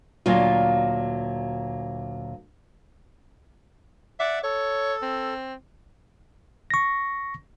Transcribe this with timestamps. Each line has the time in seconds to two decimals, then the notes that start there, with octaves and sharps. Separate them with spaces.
0.26 D2 A#2 F#3 F4
4.20 D5 E5 F#5 D6
4.43 A4 C#5
5.02 C4
6.70 C#6 A#6